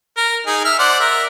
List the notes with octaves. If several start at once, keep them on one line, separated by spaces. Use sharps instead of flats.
A#4
D#4 G#4
E5 F6
C5 D5 F#5
A#4 E5